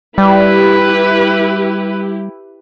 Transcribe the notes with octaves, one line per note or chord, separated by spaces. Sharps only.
G3 E4 G4 B4